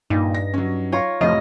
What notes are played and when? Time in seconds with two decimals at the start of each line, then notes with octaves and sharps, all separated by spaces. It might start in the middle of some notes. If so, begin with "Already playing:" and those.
0.10 G2 A#2 D#4
0.34 A#6
0.54 F#3 C#4
0.92 F4 C#5 A#5
1.21 F1 A2 F3 D#5 F6